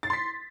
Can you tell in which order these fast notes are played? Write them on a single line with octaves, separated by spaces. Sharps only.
A6 C7 C6 B6